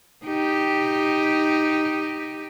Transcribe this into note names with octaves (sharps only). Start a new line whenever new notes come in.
D#4 G4